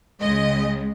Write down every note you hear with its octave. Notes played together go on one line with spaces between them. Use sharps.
C#2 C#3 G#3 D#5